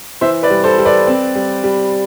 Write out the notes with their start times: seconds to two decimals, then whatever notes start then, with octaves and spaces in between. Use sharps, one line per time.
0.21 E3 C5 E5
0.43 B4 D5
0.50 G3
0.64 A4 C5
0.78 G3
0.85 B4 D5
1.07 C4
1.35 G3
1.64 G3